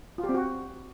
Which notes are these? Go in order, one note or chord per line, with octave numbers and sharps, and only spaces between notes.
F4
G4
C4
F#4